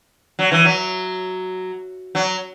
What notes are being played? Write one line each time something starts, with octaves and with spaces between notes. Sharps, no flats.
F#3
E3
F#3
F#3